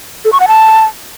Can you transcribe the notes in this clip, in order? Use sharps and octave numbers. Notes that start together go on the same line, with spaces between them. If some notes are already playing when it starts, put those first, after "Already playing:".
A4
C#6
F#5
A5